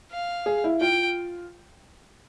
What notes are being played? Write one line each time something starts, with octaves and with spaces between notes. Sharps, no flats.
F5
G#4
E4
F4 G5